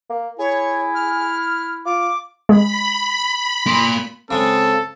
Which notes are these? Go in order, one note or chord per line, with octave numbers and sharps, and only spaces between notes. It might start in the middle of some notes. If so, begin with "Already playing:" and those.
A#3
E4 G#4 C#5
F6
F4 D6
G#3 B5
A#3 C6
C#3 G#3 C4 A4